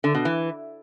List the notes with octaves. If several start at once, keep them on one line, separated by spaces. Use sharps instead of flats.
D3
B2
E3